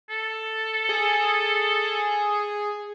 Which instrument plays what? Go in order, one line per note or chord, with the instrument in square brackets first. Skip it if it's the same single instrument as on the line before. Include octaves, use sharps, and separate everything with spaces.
[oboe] A4
[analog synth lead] G#4